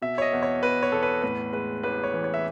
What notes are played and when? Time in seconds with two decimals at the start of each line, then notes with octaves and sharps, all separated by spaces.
0.02 B2 E5
0.18 C#5
0.22 D#5
0.33 E2
0.43 C#5
0.63 E2 B4
0.83 C#5
0.92 E2 A4
1.03 B4
1.22 A2 B4
1.52 G#3 B4
1.83 A1 B4
2.04 C#5
2.14 E3
2.24 C#5
2.34 E5